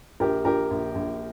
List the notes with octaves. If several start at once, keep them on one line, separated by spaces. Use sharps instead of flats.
A#1 G4 A#4
A#1 G4 A#4
A#1
A#1